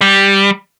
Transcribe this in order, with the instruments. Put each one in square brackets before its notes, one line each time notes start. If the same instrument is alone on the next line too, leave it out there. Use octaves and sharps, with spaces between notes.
[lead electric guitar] G3